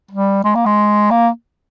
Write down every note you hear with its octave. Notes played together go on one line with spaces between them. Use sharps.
G3
G#3
A#3
G#3
A#3